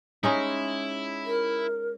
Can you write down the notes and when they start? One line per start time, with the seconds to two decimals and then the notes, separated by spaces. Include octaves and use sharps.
0.23 G#3 C#4 D#4 E4
1.25 A#4